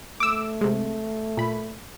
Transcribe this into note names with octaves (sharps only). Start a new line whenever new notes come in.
A3 D6 E6
C3 G#3
A#2 B5